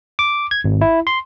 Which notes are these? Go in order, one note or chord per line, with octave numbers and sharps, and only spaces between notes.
D6
G#6
G#1
E4
C6